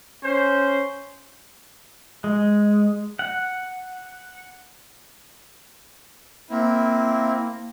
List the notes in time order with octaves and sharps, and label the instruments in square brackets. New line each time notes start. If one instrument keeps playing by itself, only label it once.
[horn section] C#4 C5
[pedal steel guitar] G#3
F#5
[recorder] A#3 [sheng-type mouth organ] C4 E4